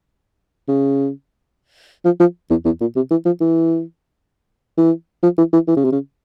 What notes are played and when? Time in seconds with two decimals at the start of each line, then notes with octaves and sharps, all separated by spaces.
0.68 C#3
2.05 F3
2.20 F3
2.50 E2
2.65 E2
2.81 A#2
2.96 C3
3.11 E3
3.26 F3
3.41 E3
4.77 E3
5.23 F3
5.38 E3
5.53 E3
5.68 E3
5.77 C#3
5.84 C3
5.92 C#3